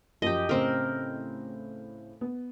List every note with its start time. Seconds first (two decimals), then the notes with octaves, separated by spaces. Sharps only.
0.22 F#2 F3 G4 D#5
0.49 A2 C#3 C4 A#4
2.21 B3